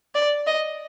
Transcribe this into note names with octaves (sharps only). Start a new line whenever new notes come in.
D5
D#5